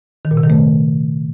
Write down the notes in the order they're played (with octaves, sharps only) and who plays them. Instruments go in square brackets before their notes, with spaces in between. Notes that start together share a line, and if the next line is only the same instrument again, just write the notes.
[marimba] D#3
A#2
C3
D#3
A3